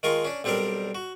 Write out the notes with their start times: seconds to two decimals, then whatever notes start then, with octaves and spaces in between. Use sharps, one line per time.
0.03 D#3 G#3 F4 A#4 C#6
0.25 C#4 D4
0.44 B1 G3 C4 D4 G4 A#4
0.95 F#4